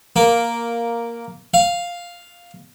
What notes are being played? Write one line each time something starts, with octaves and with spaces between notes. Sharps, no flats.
A#3
F5